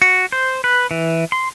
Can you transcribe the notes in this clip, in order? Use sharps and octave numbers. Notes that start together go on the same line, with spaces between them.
F#4
C5
B4
E3
C6